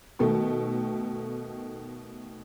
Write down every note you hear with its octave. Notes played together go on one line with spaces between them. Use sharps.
B2 D#3 A3